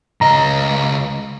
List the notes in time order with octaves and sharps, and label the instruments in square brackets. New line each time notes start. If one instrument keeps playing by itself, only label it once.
[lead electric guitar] C#2 D#5 [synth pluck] A#5